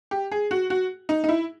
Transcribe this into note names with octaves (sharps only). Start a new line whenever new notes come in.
G4
G#4
F#4
F#4
D#4
D#4
E4